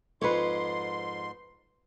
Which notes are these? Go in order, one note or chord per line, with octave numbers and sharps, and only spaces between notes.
F2 G#2 B4 C#5 C6